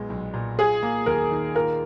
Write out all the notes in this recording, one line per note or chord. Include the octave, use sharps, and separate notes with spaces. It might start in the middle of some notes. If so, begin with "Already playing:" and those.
Already playing: B1 A#2 G#3 B3
B1
A#2
F4 G#4
A#3
D#2 A#4
D#3
F4 A#4